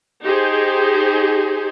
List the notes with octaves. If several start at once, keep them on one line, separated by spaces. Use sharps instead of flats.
D#4 G4 G#4 C5